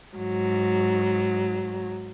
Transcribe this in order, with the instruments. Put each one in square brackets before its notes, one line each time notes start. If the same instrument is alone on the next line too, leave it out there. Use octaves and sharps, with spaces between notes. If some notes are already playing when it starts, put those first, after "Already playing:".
[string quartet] G#2 F#3